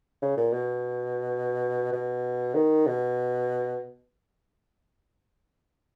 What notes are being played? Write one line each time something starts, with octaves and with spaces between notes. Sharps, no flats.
C#3
A#2
B2
B2
D#3
B2